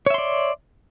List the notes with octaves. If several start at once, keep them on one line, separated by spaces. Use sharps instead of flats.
C#5 D5 E5 C6